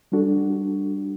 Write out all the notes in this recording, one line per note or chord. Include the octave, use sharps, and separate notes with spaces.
G3 D4 F#4 A4